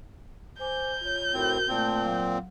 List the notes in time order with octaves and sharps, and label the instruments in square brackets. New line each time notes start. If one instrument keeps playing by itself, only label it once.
[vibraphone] C5 G#5 D6 [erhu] G6
[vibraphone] F4 C#5
[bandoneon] A2 C4 [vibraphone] F#4 A#4 C5
[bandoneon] A#2 C4 [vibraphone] A3 A5 C6
[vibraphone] F#3 F5 F#5